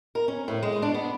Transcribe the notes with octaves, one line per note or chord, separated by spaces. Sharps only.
A#4
C#4
A2
G#3
D4
B3